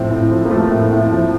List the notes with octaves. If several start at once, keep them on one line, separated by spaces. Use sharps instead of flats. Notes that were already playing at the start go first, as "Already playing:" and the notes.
Already playing: A2 F3 C4
A2
F3
A#3
F3 A3
A2
A2
F3